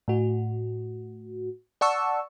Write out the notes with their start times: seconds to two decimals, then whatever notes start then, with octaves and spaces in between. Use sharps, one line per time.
0.08 A2 F#4
1.81 D5 F#5 A5 C#6 E6